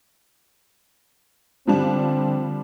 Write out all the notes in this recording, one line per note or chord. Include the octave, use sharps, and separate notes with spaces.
D3 F3 G3 C4 D4